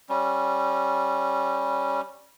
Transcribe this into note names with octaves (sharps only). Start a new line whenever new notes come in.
G3 C#4